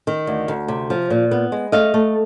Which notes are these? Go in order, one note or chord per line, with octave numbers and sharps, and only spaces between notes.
D#3
D2
D2
C3
F3
A#2
B3
G#3
A3 D#5 F5
A3